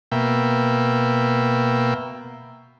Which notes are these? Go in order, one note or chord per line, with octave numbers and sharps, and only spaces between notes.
B2 A#3 E5 G5